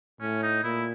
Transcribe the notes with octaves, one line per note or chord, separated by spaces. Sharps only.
A2 C#4
D#4
A#2 E4